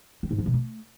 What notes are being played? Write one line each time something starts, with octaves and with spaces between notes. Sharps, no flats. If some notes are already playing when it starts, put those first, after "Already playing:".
C4
G#2
F3
B2
A3